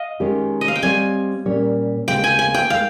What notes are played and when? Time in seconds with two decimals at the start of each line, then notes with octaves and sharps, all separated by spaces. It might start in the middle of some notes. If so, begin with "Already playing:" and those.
Already playing: D#5 F5
0.20 D#3 G#3 C#4 G4 C#5
0.61 D#5
0.68 F5
0.76 G5
0.83 G3 C4 G4 C#5 G#5
1.45 A#2 G3 C#4 G4 C#5
2.08 D#2 C#3 G#3 C4 G4 G5
2.24 G#5
2.39 G#5
2.54 G5
2.70 D#3 G#3 F5